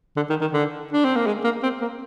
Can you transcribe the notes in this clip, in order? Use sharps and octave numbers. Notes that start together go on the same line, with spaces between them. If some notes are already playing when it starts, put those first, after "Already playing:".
D3
D#3
D#3
D3
D4
C4
A#3
G#3
A#3
C4
A#3